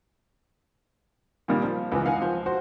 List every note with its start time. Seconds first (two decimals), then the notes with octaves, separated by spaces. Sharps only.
1.48 A#2 D#3 G3
1.63 F3
1.92 C#2 E3 B4
2.05 D#3 F5 F#5 G#5
2.21 F3
2.46 F#4 C5